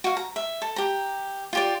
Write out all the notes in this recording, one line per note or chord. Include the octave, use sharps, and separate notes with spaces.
F#4 F5
A#5
E5
A4
G4 A#5
F4 G4 D5